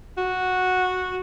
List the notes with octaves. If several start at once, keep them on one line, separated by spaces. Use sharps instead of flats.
F#4